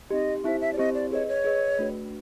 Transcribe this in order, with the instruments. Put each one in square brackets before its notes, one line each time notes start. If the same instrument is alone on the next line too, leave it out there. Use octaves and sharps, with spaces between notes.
[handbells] C4 D#4 G4 [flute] D#5
[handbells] C4 E4 G4 C5 [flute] E5
[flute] E5
D5
[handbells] C4 E4 G4 C5 [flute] D#5
[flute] D5
[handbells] G#4 B4 D#5 [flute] C#5
[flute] C#5
[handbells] G#4 B4 D#5
A3 D4 F#4 B4